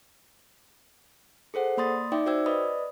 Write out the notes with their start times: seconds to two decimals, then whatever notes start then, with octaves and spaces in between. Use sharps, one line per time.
1.54 G#4 A4 C5 F#5
1.77 A#3 D5 B5 C6 D#6 A6
2.12 D#4 D5 E5 G5 D6
2.26 F#4 C5 D5 G5 E6 G#6
2.46 B4 D5 D#5 B5 D#6